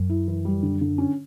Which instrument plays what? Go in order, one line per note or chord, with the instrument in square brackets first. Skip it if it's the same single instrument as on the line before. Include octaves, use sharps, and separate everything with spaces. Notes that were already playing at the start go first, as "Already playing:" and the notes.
Already playing: [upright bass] F#2
[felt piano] E4
E3
G3
D3
D3
C#4